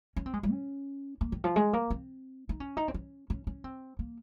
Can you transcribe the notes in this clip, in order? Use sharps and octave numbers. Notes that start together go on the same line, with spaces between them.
C#4
C4
G#3
G3
C#4
A#3
D#3
F3
G#3
A#3
C4
D#4
C#4
D#4
C4
C#4
C#4
C#4
C4
A#3